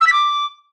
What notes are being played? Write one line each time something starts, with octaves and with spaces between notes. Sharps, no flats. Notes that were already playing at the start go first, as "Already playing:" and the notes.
E6
B6
D6